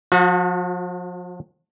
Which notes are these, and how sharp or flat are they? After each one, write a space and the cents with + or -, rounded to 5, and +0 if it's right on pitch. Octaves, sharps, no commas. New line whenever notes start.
F3 +35 F#4 -25